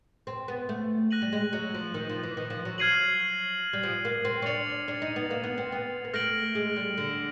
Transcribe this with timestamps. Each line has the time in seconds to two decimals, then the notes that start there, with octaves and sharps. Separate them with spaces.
0.27 C4
0.48 B3
0.69 A3
1.11 F#6 A#6 D#7 F#7
1.22 G3
1.33 G#3
1.53 F#3
1.74 F3
1.94 D#3
2.09 F3
2.23 E3
2.37 D#3
2.50 F3
2.65 F#3
2.78 F#3 F6 G#6 C7 D#7 F#7
3.73 G3
3.83 F3
4.05 A#3
4.25 C4
4.42 C#4
4.46 D4 A6 C#7 F7
4.88 D4
5.02 D#4
5.16 B3
5.31 A#3
5.43 B3
5.58 C4
5.72 B3
6.05 A#3
6.14 A3 F6 A#6 D7 F#7
6.55 G#3
6.76 G3
6.98 D3